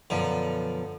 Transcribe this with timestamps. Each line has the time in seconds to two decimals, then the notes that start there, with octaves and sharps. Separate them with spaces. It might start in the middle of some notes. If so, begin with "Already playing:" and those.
0.10 F#2 B2 D3 F3